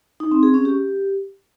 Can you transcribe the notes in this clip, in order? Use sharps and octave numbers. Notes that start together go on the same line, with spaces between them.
D#4
C4
G#4
C#4
G4